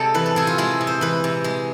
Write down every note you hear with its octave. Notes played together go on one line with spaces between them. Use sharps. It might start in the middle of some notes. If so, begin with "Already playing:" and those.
Already playing: C3 G#3 A4 D5
E3 B4
A4
C3 G#4
F4
G#3 E4
C3
C5
E3 B4
C3
G#3